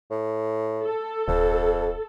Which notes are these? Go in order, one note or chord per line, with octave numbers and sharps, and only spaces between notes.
A2
A4
D1 F2